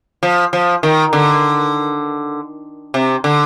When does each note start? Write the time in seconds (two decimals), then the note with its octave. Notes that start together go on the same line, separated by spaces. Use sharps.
0.23 F3
0.53 F3
0.83 D#3
1.13 D3
2.94 C3
3.24 D3